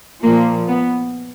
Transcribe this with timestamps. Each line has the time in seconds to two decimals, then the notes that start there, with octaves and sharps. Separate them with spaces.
0.23 A#2 F3 A#3
0.68 B3